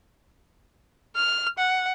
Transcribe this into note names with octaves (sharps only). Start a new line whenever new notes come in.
F6
F#5